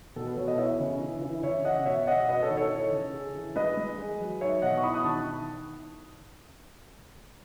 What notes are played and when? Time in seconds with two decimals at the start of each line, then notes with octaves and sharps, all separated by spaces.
0.16 B2 A4
0.27 B4
0.37 B2 A4 C#5
0.47 B4 D#5
0.58 E4 C#5 E5
0.80 C#3
1.00 E3
1.22 E3
1.43 C#3 C#5 E5
1.64 C#3 D#5 F#5
1.85 B2 C#5 E5
2.07 B2 D#5 F#5
2.29 F#4 B4 D#5
2.42 A4 C#5
2.49 D#3
2.57 A4 C#5
2.71 E4
2.92 C#3
3.14 G#4
3.35 E3
3.56 G#3 B4 D#5
3.77 G#3
3.98 G#4
4.20 F#3
4.41 D#4 C#5 E5
4.62 B2 D#5 F#5
4.77 C#6
4.83 E4 B5 D#6
4.94 D#6 F#6
5.04 D#3 A5 C#6